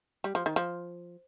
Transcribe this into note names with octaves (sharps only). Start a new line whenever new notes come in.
G3
F3
D#3
F3